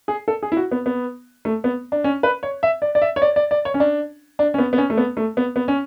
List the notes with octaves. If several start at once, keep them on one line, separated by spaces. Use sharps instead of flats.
G#4
A4
G#4
E4
F#4
B3
B3
A3
B3
D4
C#4
B4
C#5
E5
D5
D5
E5
C#5
D5
D5
D5
C#5
C#4
D4
D4
C#4
B3
B3
C#4
A3
B3
A3
B3
B3
C#4